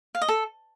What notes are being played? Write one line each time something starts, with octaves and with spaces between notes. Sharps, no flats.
F5
D#5
A4